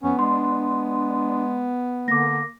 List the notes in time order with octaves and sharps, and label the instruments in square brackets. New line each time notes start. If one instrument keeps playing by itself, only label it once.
[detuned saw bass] F2 [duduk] B3 [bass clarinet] C#4
[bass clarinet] G#3 [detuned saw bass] D4 [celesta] C6
[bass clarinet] D3 [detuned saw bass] A#3 [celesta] D6 A#6